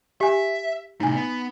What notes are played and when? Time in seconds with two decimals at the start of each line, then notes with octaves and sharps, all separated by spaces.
0.21 G4 E5 G#5
1.00 A2 C3 D#4 G#5
1.15 B3